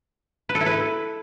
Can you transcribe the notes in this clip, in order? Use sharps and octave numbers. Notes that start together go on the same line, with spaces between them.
B4
A4
E4
B4